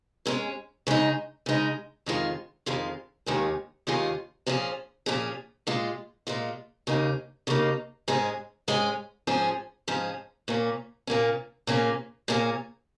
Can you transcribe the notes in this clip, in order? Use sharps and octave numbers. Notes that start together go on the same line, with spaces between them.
G#2 G#3 C#4
C#3 G#3 D#4
C#3 G#3 D#4
F2 D#3 G#3 F4
F2 D#3 G#3 F4
D#2 D#3 G#3 F4 G#4
D#2 D#3 G#3 F4 G#4
A#2 F3 C#4 G#4
A#2 F3 C#4 G#4
A#2 G#3 F4
A#2 G#3 F4
D#2 C#3 A#3 D#4
D#2 C#3 A#3 D#4
G#2 G#3 C#4 G#4
G#2 G#3 C#4 G#4
G#2 F3 C#4 G#4
G#2 F3 C#4 G#4
A#2 A#3 C#4
A#2 A#3 C#4
A#2 A#3 C#4 G#4
A#2 A#3 C#4 G#4